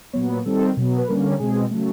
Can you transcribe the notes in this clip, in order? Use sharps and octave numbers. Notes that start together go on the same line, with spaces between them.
A#2 F#3 B3 C#5
B4
D#3 G3 C4 A4
B2 F#3 B3
B4
D3 G3 A#3 C#4 A#4
A4
B2 G#3 C4 G#4
C#3 F#3 A3